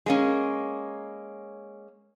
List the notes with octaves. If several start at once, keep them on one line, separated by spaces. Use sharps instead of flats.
G#3 A#3 C#4